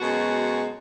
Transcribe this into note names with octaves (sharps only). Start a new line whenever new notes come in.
F#2 B2 G#3 F#4